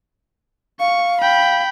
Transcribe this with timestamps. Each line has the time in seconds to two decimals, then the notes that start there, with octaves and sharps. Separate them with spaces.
0.80 F5 C#6
1.21 G5 B5